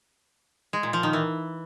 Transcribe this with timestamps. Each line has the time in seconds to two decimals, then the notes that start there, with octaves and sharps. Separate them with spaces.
0.73 G#3
0.83 A#2
0.93 F3
1.03 D#3
1.13 E3